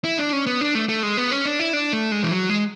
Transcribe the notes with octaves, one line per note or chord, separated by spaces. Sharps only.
E4
D4
C#4
B3
D4
A3
A3
G#3
B3
C#4
D4
E4
D4
A3
G#3
E3
F#3
G#3